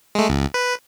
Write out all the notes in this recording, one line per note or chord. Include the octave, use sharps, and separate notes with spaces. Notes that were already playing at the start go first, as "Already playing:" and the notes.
G#3 A3
C#2
B4